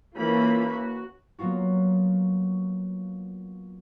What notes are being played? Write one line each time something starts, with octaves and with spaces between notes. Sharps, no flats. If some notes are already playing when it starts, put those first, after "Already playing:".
E3 A#3 C#4 F4 B5
F#4
F#3 A#3 B3 F4 F#4